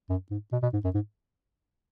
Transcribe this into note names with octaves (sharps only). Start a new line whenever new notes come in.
F#2
G#2
B2
B2
G#2
F#2
G#2